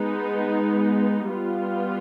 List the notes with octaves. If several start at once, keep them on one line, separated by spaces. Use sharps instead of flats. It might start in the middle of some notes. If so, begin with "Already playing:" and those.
Already playing: G#3 B3 D#4
G3 B3 F4